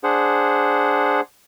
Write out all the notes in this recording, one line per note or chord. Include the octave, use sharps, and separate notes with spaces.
D4 G#4 C5 F#5